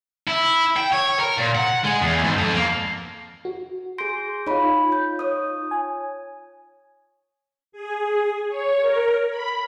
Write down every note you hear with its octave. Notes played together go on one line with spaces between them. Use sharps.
E4
G5
C#5
A#4
A#2
F#5
G#3
E2
G#2
F2
A#3
F#4
G#4 C6 G6 A#6 D7
D#4 F4 C#5 B5
G6
C#5 D#6
G#5
G#4
C#5
A#4
B5